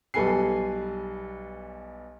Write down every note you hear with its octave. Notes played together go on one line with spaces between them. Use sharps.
B1 G3 A4 B4 G#5 C7